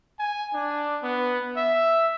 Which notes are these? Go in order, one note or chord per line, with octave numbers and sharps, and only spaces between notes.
G#5
D4
B3
E5